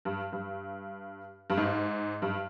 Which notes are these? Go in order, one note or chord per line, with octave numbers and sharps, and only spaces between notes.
G2
G2
G2
G#2
G2